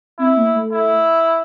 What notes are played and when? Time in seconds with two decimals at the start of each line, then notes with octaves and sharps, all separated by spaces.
0.19 C4 E4
0.37 A#3
0.54 A3
0.73 E4